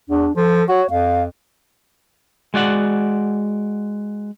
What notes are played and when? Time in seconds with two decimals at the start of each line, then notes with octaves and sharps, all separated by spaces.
0.09 E2 D4
0.36 F3 A4
0.69 F#4 C#5
0.90 F2 F5
2.54 G#3 F#4 D5 F#5